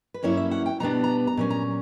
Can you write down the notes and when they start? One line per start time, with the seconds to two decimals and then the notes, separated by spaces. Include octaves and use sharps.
0.14 B4
0.23 G2 F#3 A#3 C#4 E4 C#5
0.37 E5
0.51 F#5
0.66 G5
0.80 B2 G3 B3 D4 A#5
1.04 A#5
1.27 A#5
1.37 A#2 F#3 C#4
1.50 A#5